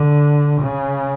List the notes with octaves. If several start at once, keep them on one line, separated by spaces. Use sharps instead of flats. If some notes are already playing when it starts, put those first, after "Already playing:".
Already playing: D3
C#3